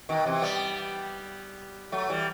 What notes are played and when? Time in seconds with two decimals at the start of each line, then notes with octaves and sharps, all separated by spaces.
0.09 B2 D#3
0.26 C3 E3
0.42 G3 B3
1.92 F#3 A3
2.09 E3 G3